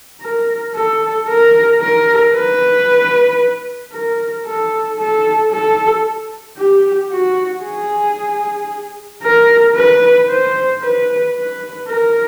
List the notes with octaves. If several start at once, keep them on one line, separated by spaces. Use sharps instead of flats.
A#4
A4
A#4
A#4
B4
A#4
A4
A4
A4
G4
F#4
G#4
A#4
B4
C5
B4
B4
A#4